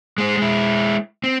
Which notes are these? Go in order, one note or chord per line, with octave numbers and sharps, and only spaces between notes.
G#3 C5
G#3 E4
C4